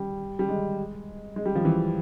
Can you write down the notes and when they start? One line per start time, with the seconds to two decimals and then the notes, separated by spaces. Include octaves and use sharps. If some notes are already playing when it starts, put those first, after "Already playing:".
Already playing: G3
0.39 G3
0.49 G#3
1.36 G#3
1.46 G3
1.55 F3
1.65 E3